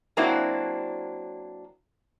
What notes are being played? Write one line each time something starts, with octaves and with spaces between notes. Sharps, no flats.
F#3 A#3 C4 D4 E4 F#4